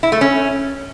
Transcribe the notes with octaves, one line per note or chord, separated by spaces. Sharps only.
E4
A3
C#4